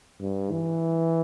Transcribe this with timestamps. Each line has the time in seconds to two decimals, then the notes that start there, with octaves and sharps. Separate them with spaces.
0.21 G2
0.51 E3